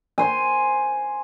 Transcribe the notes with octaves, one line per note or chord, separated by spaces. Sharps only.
C5 G#5